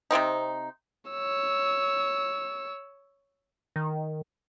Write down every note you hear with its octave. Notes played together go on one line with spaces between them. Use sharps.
C3 D#3 C4 D#4
C#5 E6
D#3